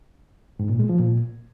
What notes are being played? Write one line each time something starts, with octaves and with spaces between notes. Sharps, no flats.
G#2
A#2
G#3
F3
A#2